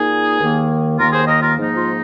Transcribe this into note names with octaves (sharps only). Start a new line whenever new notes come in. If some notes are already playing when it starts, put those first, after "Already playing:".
Already playing: A#2 A#3 D#4 G#4
D#2 D#3 A#3
D#2 D#3 A#3 F4 A#4
G#4 C5
A#4 D#5
F4 A#4
G#2 F3 A#3 D#4
F4